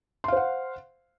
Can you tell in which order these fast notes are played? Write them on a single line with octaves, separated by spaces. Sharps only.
C6 F5 C5 F#5